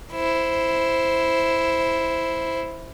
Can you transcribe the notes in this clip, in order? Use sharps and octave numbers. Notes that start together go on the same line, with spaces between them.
E4 C5